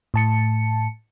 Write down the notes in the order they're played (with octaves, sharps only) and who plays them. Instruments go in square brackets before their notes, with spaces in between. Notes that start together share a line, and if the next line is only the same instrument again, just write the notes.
[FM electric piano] A2 A5 C#7